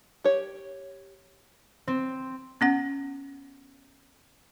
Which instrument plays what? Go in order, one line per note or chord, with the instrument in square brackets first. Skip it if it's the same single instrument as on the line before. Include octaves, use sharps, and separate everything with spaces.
[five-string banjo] G4 C#5
[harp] C4
[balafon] B3 C#4 F#5